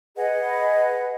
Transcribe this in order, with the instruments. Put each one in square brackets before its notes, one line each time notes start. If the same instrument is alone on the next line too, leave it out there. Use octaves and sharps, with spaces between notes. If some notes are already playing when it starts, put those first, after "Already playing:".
[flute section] G#4 B4 D#5 F#5